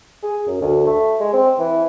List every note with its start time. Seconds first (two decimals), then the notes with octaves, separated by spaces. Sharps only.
0.23 G#4
0.47 F#2
0.61 D2
0.87 A3
1.20 G#3
1.33 C4
1.59 E3